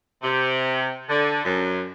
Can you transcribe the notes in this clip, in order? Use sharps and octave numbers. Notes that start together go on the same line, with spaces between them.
C3
D3
F#2